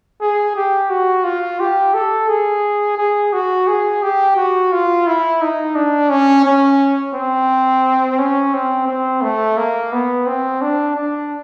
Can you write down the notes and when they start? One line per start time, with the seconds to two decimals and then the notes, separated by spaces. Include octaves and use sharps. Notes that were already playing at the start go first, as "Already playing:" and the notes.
0.21 G#4
0.56 G4
0.90 F#4
1.24 F4
1.60 G4
1.94 A4
2.29 G#4
2.98 G#4
3.33 F#4
3.67 G#4
4.03 G4
4.36 F#4
4.72 F4
5.07 E4
5.41 D#4
5.75 D4
6.10 C#4
6.45 C#4
7.14 C4
8.19 C#4
8.54 C4
8.88 C4
9.22 A3
9.57 A#3
9.92 B3
10.27 C4
10.62 D4
10.96 D4